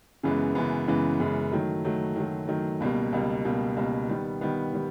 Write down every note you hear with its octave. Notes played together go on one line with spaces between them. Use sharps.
F#2 C#3 E3 G#3 B3
F#2 C#3 E3 G#3 B3
F#2 C#3 E3 G#3 B3
F#2 C#3 E3 G#3 B3
D#3 F#3 A3
D#3 F#3 A3
D#3 F#3 A3
D#3 F#3 A3
C#2 B2 G3 A#3
C#2 B2 G3 A#3
C#2 B2 G3 A#3
C#2 B2 G3 A#3
D#3 G3 B3
D#3 G3 B3
D#3 G3